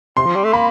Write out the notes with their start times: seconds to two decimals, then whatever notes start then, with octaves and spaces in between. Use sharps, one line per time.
0.17 C3 C6
0.26 F3
0.35 G3
0.44 A3
0.53 A#3 B5